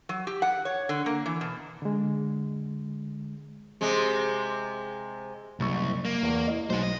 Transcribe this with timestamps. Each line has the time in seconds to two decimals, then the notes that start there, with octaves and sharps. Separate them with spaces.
0.09 F#3
0.27 G4
0.42 F#5
0.65 C#5
0.89 D3
1.06 A#3
1.26 E3
1.41 B2
1.82 D3 G#3
3.81 C3 G#3
5.60 F#1 C2 C#6
6.05 A#3
6.23 E2
6.47 E4 D#5
6.70 B1 D#4 C5
6.83 D#5